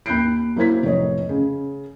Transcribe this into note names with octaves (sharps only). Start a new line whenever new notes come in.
D#2 B5 F#6 G6 C7 D7
F#3 A#3 E4 C5 G#6 B6
F1 A2 C#5 D#5
C#3